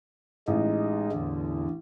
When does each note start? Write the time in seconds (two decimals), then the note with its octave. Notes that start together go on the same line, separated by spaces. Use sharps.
0.48 A1 G#3 D#4
1.13 E2 D3